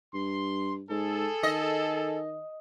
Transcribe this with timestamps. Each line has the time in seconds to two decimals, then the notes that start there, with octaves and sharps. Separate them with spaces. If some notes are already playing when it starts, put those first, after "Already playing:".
0.14 G2 C6
0.90 G#2 G#4 A4
1.43 D#3 D#5